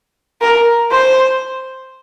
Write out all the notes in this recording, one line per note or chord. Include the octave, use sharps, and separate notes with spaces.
A#4
C5